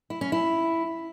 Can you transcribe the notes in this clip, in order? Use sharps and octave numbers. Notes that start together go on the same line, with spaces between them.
E4
C#4
E4